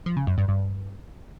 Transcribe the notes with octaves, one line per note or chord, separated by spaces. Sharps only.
F3
C#3
F#2
G2
G2